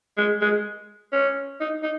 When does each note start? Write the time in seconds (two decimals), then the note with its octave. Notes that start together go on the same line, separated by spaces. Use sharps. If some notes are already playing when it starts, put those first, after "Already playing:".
0.18 G#3
0.41 G#3
1.13 C#4
1.61 D#4
1.83 D#4